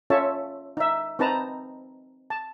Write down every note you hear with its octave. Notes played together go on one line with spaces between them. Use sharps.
C#4 F4 A4 C#5 E5 A5
D#4 E5
C4 D#4 B4 A5 A#5
A5